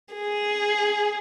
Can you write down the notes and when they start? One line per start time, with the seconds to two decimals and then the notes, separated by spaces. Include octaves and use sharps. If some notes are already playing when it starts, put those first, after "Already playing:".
0.14 G#4